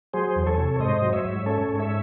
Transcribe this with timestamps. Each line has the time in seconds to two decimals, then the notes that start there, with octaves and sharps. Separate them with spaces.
0.13 F#3 G#4 C5
0.36 E2
0.47 A4 C#5
0.58 C3
0.80 G#2 C5 D#5
1.02 F#3
1.13 C#5 E5
1.25 G#2
1.46 C#4 A4 C#5
1.69 G#2
1.79 C#5 E5